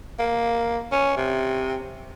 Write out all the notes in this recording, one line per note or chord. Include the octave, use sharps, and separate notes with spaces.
A#3
C#4
C3